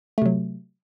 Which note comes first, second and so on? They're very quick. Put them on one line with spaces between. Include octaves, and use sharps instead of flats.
A3 C3 F#3